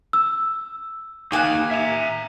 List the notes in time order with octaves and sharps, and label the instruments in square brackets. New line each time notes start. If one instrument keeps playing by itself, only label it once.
[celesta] E6
[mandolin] A#3 G#5 F#6 [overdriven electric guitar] D#4 G4
[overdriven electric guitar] E5 A#5